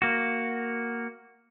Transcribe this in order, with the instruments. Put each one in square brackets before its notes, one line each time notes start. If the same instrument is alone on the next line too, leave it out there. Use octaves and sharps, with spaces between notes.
[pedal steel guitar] A#3 F#4